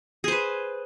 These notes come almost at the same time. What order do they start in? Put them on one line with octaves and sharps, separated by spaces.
G#4 C5 B4